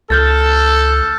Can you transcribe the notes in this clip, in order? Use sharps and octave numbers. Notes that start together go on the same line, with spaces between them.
C#2 A4 F6 G6 A6